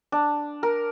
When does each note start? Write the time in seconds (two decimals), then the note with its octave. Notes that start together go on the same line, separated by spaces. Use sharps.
0.12 D4
0.63 A#4